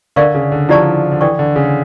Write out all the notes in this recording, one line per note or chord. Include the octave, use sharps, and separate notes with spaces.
D3 A#4 D5 F5 C#6
C#3
D3
F3 E4 G4 D5 A5 C#6
D3
E3 A4 D5 G5 C#6
D3
C#3